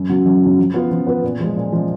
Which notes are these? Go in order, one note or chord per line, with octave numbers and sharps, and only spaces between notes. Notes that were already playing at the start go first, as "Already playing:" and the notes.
Already playing: F#2
C#3 F#3
F#2
C#3 F#3
F3
B3 F4 B4
F3
B3 F4 B4
A#2
F3 G#3
A#2
F3 G#3